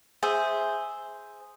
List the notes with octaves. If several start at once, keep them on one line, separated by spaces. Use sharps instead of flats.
G#4 C5 E5